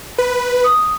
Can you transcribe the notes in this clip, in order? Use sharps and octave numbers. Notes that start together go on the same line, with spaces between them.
B4
D#6